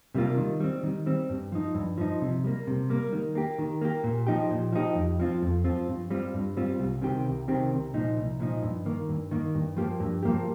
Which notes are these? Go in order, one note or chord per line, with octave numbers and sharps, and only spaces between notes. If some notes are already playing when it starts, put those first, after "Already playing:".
C3 G3 A#3 F4
D#3
G3 C4
D#3
G3 C4
G2
F3 D#4
G2
F3 D#4
C3
G3 A#3
C3
G3 A#3
D#3
A#3 G4
D#3
A#3 G4
A#2
F3 D#4 G4
A#2
F3 D#4 G4
F2
F3 C4 F4
F2
F3 C4 F4
G2
G3 C4 F4
G2
G3 C4 F4
C2
C3 D#3 C4 G4
C2
C3 D#3 C4 G4
C2
A#2 F3 D#4
C2
A#2 F3 D#4
G2
D#3 A#3
G2
D#3 A#3
G2
F3 A#3 G4
G2
F3 A#3 G4